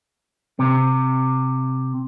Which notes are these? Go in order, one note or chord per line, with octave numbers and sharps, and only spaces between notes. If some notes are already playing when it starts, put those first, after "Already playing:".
C3